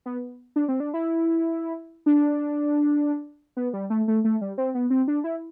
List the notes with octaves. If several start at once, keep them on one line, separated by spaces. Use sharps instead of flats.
B3
D4
C4
D4
E4
D4
B3
G3
A3
A3
A3
G3
C4
B3
C4
D4
E4